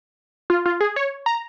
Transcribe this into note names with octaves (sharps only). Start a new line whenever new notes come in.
F4
F4
G#4
C#5
A#5